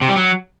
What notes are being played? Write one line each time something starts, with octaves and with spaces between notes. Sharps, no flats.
C3
G3
F#3